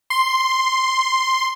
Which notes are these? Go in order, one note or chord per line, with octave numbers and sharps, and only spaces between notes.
C6